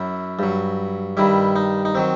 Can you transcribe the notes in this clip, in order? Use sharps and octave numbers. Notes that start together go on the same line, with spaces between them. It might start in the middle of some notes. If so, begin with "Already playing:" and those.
Already playing: F#2 F#3 E4
G2 F#3
G2 D#3 G3 E4
D#4
D#4
D#3 F#3 C4